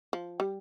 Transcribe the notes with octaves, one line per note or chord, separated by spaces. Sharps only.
F3
G3